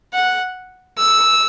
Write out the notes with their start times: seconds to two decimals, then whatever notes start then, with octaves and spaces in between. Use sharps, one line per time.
0.13 F#5
0.98 E6